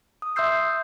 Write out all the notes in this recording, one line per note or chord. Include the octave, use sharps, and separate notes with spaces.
D#6
E5 C6 D#6 E6 G6 C7